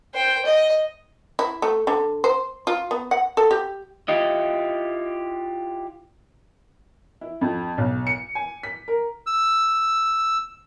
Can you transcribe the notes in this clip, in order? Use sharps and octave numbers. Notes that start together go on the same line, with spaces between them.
C5 G5
D#5
E4
A3
D3
C5
F4
B3
F#5
A4
G4
E4 F4 G4 D#5
E4
F2
B1
C#7
G#5
B6
A#4
E6